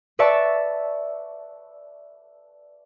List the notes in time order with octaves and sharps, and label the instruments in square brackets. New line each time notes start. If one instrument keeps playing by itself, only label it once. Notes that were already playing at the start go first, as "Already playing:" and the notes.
[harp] B4 D5 E5 A5 C#6 E6